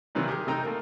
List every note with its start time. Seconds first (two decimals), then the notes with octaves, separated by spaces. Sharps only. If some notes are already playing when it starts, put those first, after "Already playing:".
0.15 C3 D#3 E3 F#3 G3 A#3
0.29 G4 G#4 A#4
0.47 C3 A3 D#4 G5 A#5 E6
0.63 A3 A#3 D#4 A#4